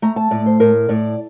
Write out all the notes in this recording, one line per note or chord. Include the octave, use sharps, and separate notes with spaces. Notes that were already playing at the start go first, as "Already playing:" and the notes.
A3 A#5
A5
A2 D5
C5
A2 A#4
A2 D5